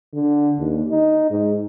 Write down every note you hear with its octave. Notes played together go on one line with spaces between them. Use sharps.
D3
D#2
D#4
G#2